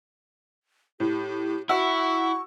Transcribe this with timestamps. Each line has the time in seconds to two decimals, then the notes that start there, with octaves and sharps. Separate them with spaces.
1.00 A2 G4
1.69 E4 F#4 C#6 E6